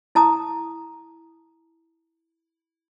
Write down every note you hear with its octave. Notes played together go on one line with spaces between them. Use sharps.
E4 A5 A#5 D#6